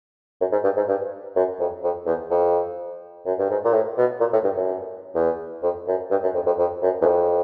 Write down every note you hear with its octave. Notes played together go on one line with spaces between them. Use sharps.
F#2
G#2
G2
G#2
G2
F#2
F2
F2
E2
F2
F#2
G2
G#2
A#2
A2
B2
A#2
A2
G2
F#2
E2
F2
F#2
G2
F#2
F2
F2
F2
F#2
E2
F2